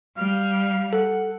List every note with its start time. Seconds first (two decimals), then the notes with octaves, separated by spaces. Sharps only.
0.17 G3 F5
0.93 A4 F#5